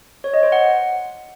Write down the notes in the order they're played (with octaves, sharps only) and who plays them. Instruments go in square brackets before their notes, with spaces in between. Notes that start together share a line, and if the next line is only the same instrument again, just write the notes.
[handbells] C#5
D#5
C5
F#5